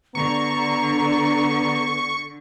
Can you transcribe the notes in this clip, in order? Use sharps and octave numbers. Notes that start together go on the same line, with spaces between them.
D3 B3 A#5 C#6